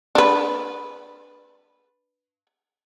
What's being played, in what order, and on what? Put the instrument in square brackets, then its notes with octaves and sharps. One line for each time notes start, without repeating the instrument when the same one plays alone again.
[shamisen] D4 B4